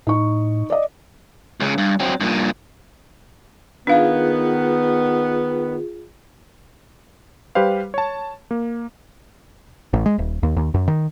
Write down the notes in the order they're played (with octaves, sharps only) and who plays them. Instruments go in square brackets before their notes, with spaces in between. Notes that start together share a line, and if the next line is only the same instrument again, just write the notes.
[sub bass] A2 [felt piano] D#4 C#6
[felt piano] D5 D#5
[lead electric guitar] C#2 C#3
G2
F#3 C4
G2 A#2
[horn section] D#3 B3 [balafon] D4 F5 [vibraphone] F4 G#4
[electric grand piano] G3 G4 B4 C5 F5
C#5 A5
A#3
[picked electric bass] A1
G#3
D#1
D#2
D#2
F#2
D#3